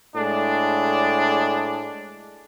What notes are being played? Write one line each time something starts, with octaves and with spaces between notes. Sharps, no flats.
A2 G#3 D4